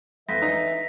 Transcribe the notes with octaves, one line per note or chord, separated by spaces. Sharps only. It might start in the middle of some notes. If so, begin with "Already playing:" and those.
F2 E3 E5 A#6 B6
D#4